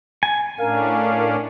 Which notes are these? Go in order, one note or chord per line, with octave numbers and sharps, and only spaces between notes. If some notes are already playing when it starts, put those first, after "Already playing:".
G#5
A2 C#4 D4 A#4 F5